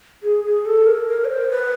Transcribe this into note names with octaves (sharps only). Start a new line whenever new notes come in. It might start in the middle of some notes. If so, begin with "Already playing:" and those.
G#4
G#4
A4
A#4
A#4
C#5
C5
B4